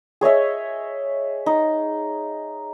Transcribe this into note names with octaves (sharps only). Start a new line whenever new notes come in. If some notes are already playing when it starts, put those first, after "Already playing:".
G#4 C#5 D#5 E5
D#4